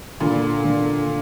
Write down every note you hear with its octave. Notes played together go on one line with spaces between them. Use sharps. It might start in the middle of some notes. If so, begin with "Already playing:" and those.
A#2 D3
D3